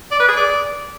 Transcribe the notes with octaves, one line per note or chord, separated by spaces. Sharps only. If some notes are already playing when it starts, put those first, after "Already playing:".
D5
B4
G#4
D5